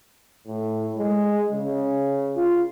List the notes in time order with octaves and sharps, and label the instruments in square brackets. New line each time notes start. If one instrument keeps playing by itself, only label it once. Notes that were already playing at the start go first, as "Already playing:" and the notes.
[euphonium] A2
G#3
C#3
F4